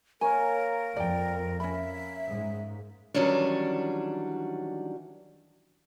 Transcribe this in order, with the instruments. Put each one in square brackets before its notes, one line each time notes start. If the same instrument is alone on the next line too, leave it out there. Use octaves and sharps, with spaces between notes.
[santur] A#3 C#5 [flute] A#4 [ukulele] G#5
[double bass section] F2 [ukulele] D5 G5
[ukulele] C#4 B5 [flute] E5
[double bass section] G#2
[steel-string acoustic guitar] D#3 E3 F#3 G3 C#4 D4